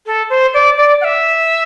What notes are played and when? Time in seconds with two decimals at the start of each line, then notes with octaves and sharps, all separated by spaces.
0.06 A4
0.30 C5
0.54 D5
0.77 D5
1.01 F#5
1.04 E5